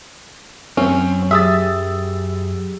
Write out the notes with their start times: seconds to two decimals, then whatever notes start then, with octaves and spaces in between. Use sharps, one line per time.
0.77 F#2 C4 C#4
1.31 F#3 G4 G#4 E5 D#6 E6 A6